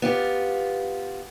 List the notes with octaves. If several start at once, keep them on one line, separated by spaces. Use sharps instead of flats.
B3 F4 G4